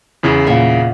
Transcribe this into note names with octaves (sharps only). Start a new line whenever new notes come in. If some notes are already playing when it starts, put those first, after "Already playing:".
E2 C#3 E4
A#2 E5 F#5